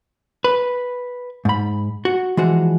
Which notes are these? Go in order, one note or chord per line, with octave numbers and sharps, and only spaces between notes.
B4
G#2 B5
F#4
E3 F3 G#3 F#4